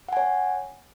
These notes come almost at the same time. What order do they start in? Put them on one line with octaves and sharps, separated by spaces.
F#5 G#5 C#5